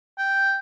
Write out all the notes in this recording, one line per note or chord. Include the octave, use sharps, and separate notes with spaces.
G5